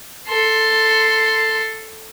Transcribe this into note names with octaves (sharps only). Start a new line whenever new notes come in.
A4 C6